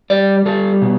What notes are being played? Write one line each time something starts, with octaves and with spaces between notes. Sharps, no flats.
G3 D5
G3 A4
B2